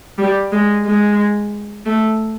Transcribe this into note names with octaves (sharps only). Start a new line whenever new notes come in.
G3
G#3
G#3
A3